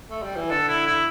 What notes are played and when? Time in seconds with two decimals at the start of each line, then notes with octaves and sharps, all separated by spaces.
0.10 A3
0.23 G3
0.36 E3
0.49 D3 A4
0.68 E4
0.86 E4